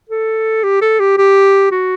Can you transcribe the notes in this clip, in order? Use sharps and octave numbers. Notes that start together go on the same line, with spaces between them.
A4
G4
A4
G4
G4
F#4